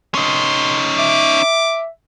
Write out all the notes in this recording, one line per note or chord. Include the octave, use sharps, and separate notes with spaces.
C#4 D#4 C6
E5 D6